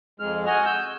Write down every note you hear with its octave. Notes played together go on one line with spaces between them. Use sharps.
F2 G#3 F6
F#4 D#5 G#5 F6
E6 G6